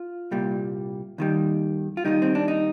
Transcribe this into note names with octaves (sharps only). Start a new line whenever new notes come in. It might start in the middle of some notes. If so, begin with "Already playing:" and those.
Already playing: F4
C2 A#2 G3
D#2 D#3 G3
F4
D#2 D#3 G3 D#4
C4
D4
D#4